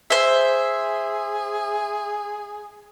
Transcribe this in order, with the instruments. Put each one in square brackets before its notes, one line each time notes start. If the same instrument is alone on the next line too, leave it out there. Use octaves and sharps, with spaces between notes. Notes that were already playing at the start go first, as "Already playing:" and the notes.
[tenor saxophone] G#4 [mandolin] C5 E5